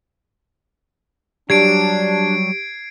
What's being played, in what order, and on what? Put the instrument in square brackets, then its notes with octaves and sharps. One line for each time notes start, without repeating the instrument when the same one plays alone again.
[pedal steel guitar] F#3 G3 [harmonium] D4 [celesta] G4 [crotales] G#6 C7 D7